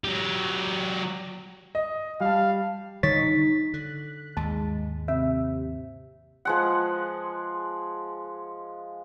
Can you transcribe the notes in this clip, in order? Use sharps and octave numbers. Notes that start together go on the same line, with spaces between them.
F#3 G4
D#5
G3 F5 A5
D3 D#3 G3 D#4 C#5 A6 B6
D3 F#6
D#2 G#2 G#3 A5
C3 E5
F3 G#3 F#5